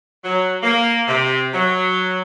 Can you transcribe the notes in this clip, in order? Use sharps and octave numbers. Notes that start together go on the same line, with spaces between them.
F#3
A#3
C3
F#3